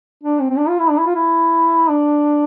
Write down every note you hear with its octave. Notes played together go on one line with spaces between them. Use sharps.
D4
C4
C4
D4
F4
E4
D4
E4
F4
E4
D4